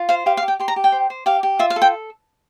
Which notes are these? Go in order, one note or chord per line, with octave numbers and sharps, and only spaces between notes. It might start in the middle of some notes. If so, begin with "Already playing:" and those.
Already playing: F4
C5 F5
G4 F5
F5
G4
G5
G4 C6
A#5
G4
G5
C5
C5
G4 F5
G4
F4 E5
F5
A4
G5